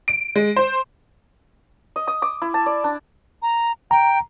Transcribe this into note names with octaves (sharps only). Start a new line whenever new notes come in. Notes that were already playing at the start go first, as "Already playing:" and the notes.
D7
G#3
C5
D#5
D#6
D6
E4
A5
D5
D4
A#5
G5 A#5